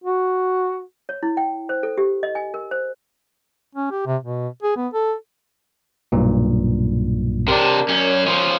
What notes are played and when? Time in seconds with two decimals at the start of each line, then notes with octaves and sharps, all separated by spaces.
0.04 F#4
1.09 C#5
1.23 E4
1.37 G5
1.69 C5
1.83 A4
1.98 G4
2.23 D#5
2.35 G#5
2.54 A#4
2.71 C5
3.75 C#4
3.91 G4
4.07 C3
4.23 B2
4.63 G#4
4.76 B3
4.93 A4
6.12 B1 G2 A#2
7.48 C3 D4 A#4 D5
7.89 F#2 C#4
8.26 F3 C#4